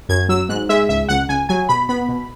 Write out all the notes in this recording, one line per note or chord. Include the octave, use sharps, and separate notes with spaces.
F#2 G#6
F#3 E6
G#2 F#6
G#3 E5
C#2 E5
C#2 F#5
C#2 G#5
F#3 G#5
B2 B5
B3 B5
B2